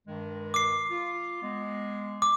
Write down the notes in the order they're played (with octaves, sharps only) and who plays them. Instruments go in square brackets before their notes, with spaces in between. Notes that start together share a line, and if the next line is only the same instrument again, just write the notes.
[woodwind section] G2 D#3 G#3
[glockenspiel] D6 C7
[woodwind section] F4
G#3 B3
[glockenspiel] D6